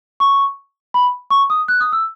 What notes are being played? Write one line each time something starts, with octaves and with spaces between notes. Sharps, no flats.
C#6
B5
C#6
D#6
F#6
D#6
E6